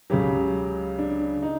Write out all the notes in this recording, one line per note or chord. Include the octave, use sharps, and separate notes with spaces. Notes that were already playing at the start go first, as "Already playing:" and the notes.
C#2 C#3 F#3 G4
D4
D#4